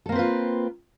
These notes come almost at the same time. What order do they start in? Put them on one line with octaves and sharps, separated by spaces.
A4 A#3 C4 B4 F4